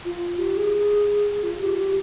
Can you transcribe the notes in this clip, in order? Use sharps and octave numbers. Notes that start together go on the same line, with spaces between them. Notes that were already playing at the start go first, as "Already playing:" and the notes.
F4
G4
G#4
F4
G4
G4